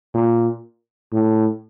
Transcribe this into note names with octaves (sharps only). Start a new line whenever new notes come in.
A#2
A2